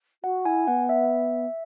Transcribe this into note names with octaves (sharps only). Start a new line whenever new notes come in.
F#4 F#5
E4 G#5
B3 F#5
E5